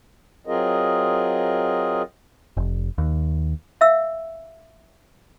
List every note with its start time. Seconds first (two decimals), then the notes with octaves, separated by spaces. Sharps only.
0.47 F#3 C4 F4 G#4 A#4 D#5
2.57 F1
2.98 D#2
3.81 E5 F5 E6